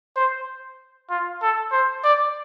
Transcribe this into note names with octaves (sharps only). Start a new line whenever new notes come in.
C5
F4
A4
C5
D5